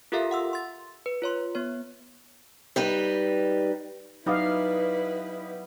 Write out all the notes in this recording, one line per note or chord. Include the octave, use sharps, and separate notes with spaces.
F4 G4 A4 A#4 E5 F5
F#5 C6 E6
C6 A6
B4
F4 C#5 C6
B3 C#5
G3 D#4 B4
F#3 G3 B3 D#4 E4 B4 D#5 F5